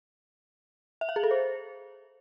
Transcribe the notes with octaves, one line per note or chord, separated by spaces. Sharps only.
E5
F5
G#4
A4
C5